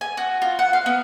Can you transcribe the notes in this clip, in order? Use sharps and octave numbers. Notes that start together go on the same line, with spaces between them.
G#5
F#4
F4
F#5
F5
B3